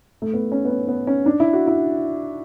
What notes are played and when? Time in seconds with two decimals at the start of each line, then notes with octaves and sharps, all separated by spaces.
0.22 A3
0.33 B3
0.52 C#4
0.65 B3
0.70 C#4
0.88 B3
1.07 C#4
1.26 D4
1.40 E4
1.53 F#4
1.67 E4